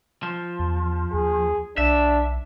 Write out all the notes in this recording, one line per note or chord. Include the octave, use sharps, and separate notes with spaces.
F3
E2
D#2 G#4
B1 D4 E5